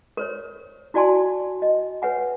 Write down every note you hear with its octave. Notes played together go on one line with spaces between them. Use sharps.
A#4 C5 C#5
E4 F#4 D5 G#5 A5 C6
D#5
B4 C#5 F#5 G#5